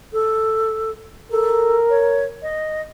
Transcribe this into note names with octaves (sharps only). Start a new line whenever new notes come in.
A4
A4 A#4
C#5
D#5